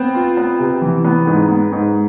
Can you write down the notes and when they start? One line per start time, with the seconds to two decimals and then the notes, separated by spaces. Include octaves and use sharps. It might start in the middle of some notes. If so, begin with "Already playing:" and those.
Already playing: B3 C4
0.15 F4
0.37 B3
0.60 C3
0.82 E3
1.05 B3
1.27 G#2
1.49 B3
1.72 G#2